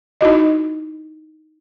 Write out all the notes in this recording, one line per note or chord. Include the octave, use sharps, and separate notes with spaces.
D#4 E4 F#4 D#5